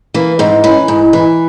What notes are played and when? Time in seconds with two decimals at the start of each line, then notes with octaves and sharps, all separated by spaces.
0.14 E3 A#3
0.39 G#2 C4
0.64 E3 C#4
0.88 G#2
1.13 E3